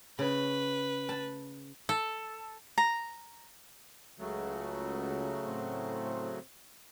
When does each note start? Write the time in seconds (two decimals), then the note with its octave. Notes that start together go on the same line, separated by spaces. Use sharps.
0.19 C#3 B4
1.09 A5
1.89 A4
2.78 A#5
4.19 C#2 C#3 F#3 A3
5.46 A2 C4 C5